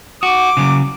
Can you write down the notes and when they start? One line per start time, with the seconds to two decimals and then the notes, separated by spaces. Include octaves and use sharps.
0.23 F#4 D6
0.57 C#3 E3 F#3